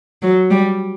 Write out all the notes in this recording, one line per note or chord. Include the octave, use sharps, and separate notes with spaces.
F#3
G3